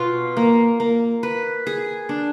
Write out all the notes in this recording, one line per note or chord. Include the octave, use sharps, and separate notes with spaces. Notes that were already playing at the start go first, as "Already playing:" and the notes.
Already playing: B2 F4 B4
A#3
A#3
B4
G#4
D4